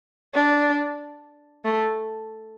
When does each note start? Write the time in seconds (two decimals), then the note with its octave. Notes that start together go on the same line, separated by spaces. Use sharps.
0.34 D4
1.64 A3